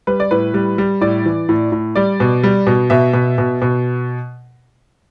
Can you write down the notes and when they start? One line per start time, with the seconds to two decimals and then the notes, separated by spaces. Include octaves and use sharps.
0.07 G3 B4
0.20 D5
0.31 A2 B4
0.54 G3
0.78 G3
1.01 A2 D5
1.26 E3
1.49 A2
1.72 A2
1.95 G3 D5
2.20 B2
2.43 G3
2.67 B2
2.90 B2 E5
3.13 B2
3.38 B2
3.62 B2